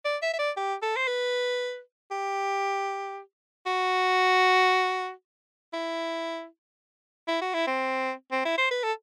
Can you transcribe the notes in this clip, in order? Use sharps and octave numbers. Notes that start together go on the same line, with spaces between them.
D5
E5
E5
D5
G4
A4
C5
B4
G4
F#4
E4
E4
F#4
E4
C4
C4
E4
C5
B4
A4